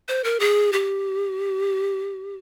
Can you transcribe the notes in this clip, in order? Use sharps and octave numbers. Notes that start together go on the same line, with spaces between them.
C5
A#4
G#4
G4